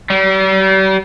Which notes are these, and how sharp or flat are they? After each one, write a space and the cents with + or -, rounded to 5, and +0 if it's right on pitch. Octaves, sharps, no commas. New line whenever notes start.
G3 -40